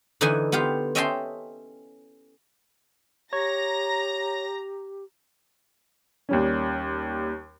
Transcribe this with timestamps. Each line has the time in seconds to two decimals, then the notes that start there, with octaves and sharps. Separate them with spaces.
0.21 D3 E3 D#4 E4 B4 G#5
0.52 B3 F4 G4 F5
0.95 C#4 D#5 E5 G5 A5 C6
3.33 G4 C#5 A#5 A#6
6.29 D#2 G3 C#4